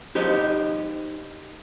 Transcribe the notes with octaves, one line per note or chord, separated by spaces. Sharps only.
D#4 G4 C5 D#5